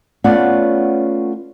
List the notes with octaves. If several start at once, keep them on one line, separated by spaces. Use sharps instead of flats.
A3 B3 C#4 F4 D5 F#5